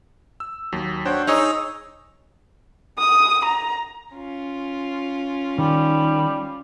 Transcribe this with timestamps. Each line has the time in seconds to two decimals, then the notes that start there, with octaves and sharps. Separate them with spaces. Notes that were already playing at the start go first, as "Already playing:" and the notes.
0.40 E6
0.72 D#2 F#3
1.05 D4 F#4 C5 C#5 G5
1.27 D#4 G#4 C#5 E6
2.99 D#6
3.45 A#5
4.13 C#4 F4
5.58 D#3 G3